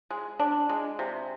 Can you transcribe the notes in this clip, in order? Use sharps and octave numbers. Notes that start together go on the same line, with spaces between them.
G#3
D4
G#3
C3